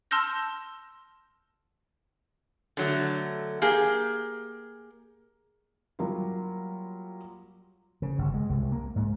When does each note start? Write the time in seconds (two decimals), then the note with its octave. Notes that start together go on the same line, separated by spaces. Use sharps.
0.11 A5 C6 E6 F6 G6 A#6
2.77 D3 F#3 A3
3.62 A#3 G4 G#4
5.99 F#3 G3 A#3 F4
8.02 C#3
8.18 G1
8.34 G#3
8.49 C2
8.72 A#3
8.96 G#2